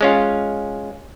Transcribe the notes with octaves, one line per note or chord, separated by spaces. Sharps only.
G#3 C#4 F4